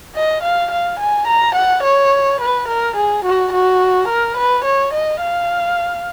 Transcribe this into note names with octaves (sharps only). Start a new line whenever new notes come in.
D#5
F5
F5
G#5
A#5
F#5
C#5
B4
A#4
G#4
F#4
F#4
A#4
B4
C#5
D#5
F5